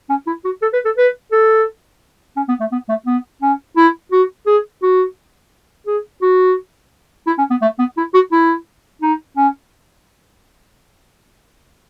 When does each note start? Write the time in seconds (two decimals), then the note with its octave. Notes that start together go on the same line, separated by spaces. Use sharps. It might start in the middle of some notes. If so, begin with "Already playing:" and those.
0.09 C#4
0.27 E4
0.45 F#4
0.62 A4
0.73 B4
0.85 A4
0.97 B4
1.32 A4
2.36 C#4
2.49 B3
2.60 A3
2.72 B3
2.89 A3
3.06 B3
3.42 C#4
3.77 E4
4.12 F#4
4.47 G#4
4.82 F#4
5.87 G#4
6.22 F#4
7.27 E4
7.38 C#4
7.50 B3
7.62 A3
7.79 B3
7.97 E4
8.14 F#4
8.32 E4
9.02 D#4
9.37 C#4